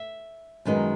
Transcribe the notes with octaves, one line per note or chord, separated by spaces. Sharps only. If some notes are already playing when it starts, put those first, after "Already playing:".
Already playing: E5
F#2 D#3 G#3 B3 D#4